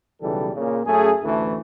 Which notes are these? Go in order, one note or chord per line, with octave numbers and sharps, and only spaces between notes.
B1 C#3 E3 G3 A4
A#2 C#3
F#2 A3 C#4 G#4
A1 D2 E3 A3